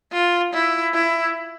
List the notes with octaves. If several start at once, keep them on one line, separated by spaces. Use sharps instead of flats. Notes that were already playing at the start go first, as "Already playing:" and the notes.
F4
E4
E4